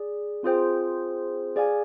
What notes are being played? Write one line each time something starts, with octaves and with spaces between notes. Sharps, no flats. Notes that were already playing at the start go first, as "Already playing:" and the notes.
Already playing: G#4 D5
C4 F4 G#4 C5 G5
G#4 D5 F5 G#5